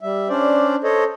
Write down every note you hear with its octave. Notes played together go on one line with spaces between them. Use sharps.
G3 E5
C#4 D4 C5 D5
A4 C5 C#5 D#5